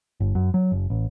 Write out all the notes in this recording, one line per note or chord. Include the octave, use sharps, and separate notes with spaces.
G1
F#2
F#3
F#1
A1